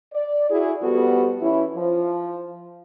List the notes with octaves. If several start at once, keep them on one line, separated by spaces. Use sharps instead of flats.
D5
E4 F#4 G#4
F2 G3 B3 F#4 A4
E3 C#4 E4
F3